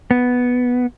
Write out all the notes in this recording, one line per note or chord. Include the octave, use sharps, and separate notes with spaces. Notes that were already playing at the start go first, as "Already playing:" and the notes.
B3